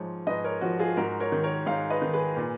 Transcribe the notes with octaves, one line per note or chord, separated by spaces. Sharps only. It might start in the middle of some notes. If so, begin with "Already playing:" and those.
Already playing: G#2 F3 C#5
G#2 B4 D#5
A#4 C#5
F3 F#4 A#4
F4 G#4
G#2 F#4 A#4
A#4 C#5
D#3
A#4 C#5
G#2 C#5 F5
B4 D#5
D#3
G#4 B4
A#2